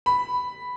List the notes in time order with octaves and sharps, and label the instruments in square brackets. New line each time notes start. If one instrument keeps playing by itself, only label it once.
[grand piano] B5